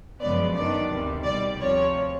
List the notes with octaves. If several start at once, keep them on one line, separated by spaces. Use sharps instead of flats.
F#2 C#3 F3 G#3 B3 D5
F#2 D#3 F#3 B3 D4 D5
D2 C3 D#3 G3
C2 B2 G3 D5
D2 C3 F3 C#5